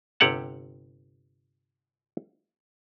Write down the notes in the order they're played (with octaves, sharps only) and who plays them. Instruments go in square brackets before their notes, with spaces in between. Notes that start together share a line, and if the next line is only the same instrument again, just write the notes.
[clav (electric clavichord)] G1 C3 G4 C#5 F#5 A5